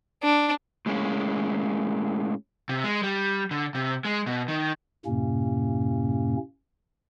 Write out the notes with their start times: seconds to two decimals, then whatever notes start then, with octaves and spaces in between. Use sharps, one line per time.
0.23 D4
0.86 A2 G#3 A#3 C#4
2.69 C3
2.84 G#3
3.03 G3
3.51 D3
3.75 C3
4.05 G#3
4.26 B2
4.48 D#3
5.06 F#2 A2 C3 A#3 C#4